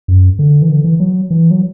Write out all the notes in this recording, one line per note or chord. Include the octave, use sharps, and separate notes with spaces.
F#2
D3
E3
D3
E3
F#3
E3
F#3